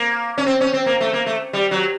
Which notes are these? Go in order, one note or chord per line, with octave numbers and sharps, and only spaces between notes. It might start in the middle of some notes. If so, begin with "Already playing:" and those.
Already playing: A#3
C#4
C4
C#4
C4
A#3
A3
A#3
A3
G3
F#3